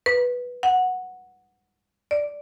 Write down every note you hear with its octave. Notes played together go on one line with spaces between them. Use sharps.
B4
F#5
D5